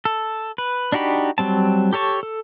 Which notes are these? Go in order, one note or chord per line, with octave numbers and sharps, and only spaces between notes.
A4
B4
D4 D#4 F#4 G4 B5
F#3 G3 C4 A5
G4 A4 C#5 A5 C#6
A4